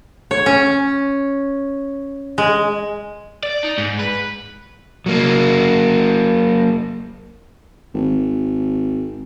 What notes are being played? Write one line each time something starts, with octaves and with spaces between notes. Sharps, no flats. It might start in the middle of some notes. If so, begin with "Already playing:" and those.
C#5
C#4
G#3
D5
D#4
G#2
B4
F#3 A#3
G#1